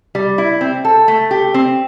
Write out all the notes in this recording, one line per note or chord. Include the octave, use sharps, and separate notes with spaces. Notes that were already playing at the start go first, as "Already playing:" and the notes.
G3
E4
C4
A4
A3
G4
C4